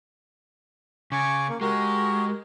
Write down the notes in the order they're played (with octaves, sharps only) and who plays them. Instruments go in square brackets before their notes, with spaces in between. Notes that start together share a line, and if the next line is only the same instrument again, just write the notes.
[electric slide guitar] C#3 [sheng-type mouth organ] G#5 C#6 D6
[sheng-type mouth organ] A#3
[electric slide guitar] G#3 [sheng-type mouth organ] F#4 G4 A#4